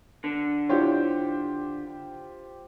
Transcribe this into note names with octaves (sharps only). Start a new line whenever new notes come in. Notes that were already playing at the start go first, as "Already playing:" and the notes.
D3
D4 E4 F4 G4 C5 C#5